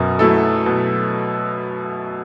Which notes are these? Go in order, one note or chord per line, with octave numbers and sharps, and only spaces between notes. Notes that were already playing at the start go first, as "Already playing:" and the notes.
Already playing: F#2 B2
F#3 A3 E4 A4
B2